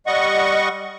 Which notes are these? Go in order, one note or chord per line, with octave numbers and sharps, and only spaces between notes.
G3 D#5 F#5 C#6